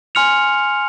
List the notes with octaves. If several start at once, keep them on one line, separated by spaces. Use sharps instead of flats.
G#5 C6 F6 C#7 F7